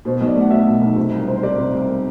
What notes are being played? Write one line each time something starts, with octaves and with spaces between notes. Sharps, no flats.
B2 C5
B1
D5
A3 F#5
F#3 E5
B2
B1
C3
C2
C4
C5
G3 D5
C3
C2